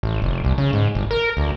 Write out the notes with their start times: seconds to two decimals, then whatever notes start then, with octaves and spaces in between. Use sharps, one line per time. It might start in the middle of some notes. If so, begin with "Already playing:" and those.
0.03 A1
0.22 F1
0.44 C2
0.58 C#3
0.73 G#2
0.95 G1
1.11 A#4
1.37 D2